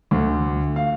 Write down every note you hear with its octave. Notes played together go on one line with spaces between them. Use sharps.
D2
F5